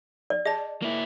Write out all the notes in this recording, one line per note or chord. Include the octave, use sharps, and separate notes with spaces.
D5
G#4 D5 D#5 A5
A#3 E4